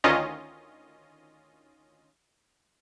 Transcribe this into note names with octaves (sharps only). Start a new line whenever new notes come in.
D2 D#3 C#4 F4 D#5